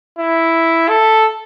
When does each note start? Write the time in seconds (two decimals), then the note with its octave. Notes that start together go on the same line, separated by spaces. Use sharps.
0.19 E4
0.89 A4